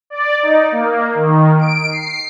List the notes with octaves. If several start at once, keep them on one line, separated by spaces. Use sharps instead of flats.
D5
D#4
A#3
D#3
D7
C7